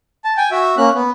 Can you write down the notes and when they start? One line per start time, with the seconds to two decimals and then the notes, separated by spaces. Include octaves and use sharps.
0.24 A5
0.37 G5 G#5
0.51 F#4 E5
0.78 A#3 C#4 F#6
0.95 B3